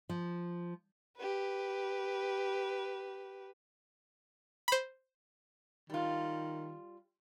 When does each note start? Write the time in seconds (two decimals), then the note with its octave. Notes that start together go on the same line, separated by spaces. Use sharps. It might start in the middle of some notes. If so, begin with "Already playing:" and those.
0.09 F3
1.17 G4 B4
4.68 C5 B5
5.90 D#3 G3 F4